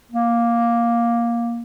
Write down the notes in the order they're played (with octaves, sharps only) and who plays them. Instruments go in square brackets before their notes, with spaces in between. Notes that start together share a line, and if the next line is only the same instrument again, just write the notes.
[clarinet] A#3